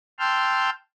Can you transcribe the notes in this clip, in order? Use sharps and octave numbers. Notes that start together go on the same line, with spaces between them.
G5 A5 C6 E6 F6 G6